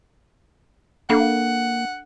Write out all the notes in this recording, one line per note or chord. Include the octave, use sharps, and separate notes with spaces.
A#3 D4 A4 F5 F#5